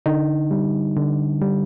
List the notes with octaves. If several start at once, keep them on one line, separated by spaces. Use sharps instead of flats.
D3 D#4
G3
D3
G3